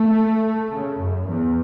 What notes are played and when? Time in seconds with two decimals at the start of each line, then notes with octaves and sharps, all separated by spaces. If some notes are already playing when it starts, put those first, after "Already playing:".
Already playing: A3
0.71 C#3
0.99 F#2
1.28 E2